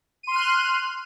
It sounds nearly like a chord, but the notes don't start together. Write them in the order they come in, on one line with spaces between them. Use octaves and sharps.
D#7 C6 F6 F#6